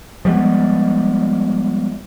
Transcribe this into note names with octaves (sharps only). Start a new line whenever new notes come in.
F3 G3 G#3 B3